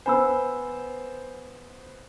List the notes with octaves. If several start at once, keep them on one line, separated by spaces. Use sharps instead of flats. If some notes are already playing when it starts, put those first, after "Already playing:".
B3 C5 G#5 B5 E6